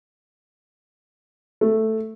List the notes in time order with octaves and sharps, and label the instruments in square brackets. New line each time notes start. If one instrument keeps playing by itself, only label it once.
[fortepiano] A3